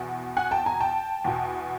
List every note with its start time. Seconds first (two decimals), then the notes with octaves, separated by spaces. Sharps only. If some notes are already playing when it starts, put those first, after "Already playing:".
Already playing: E2 B2
0.37 F#5 G#5
0.51 G5 A5
0.66 G#5 A#5
0.80 G5 A5
1.25 E2 B2